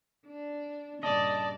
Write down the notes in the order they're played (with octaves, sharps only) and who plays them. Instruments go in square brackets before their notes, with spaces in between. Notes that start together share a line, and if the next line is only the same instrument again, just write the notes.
[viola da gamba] D4
[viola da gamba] G2 A#2 C#3 [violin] D5 [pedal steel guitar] D#5 [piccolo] A5